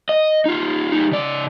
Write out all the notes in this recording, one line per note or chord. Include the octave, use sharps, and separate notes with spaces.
D#5
D#4 F4
G3 D#4
C#3 D5